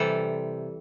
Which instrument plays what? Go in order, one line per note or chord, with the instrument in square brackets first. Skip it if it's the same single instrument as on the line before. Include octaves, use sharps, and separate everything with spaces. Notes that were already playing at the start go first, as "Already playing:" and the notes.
Already playing: [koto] C3 E3 G3 A4